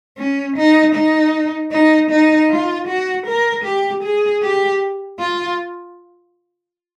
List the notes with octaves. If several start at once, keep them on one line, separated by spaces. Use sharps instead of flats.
C#4
D#4
D#4
D#4
D#4
F4
F#4
A#4
G4
G#4
G4
F4